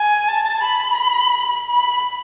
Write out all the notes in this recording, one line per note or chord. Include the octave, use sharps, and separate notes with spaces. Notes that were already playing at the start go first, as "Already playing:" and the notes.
Already playing: G#5
A5
B5
B5